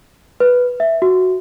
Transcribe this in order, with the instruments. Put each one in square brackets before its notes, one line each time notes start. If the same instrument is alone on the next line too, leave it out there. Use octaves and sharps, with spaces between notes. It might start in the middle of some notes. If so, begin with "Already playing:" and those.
[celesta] B4
E5
F#4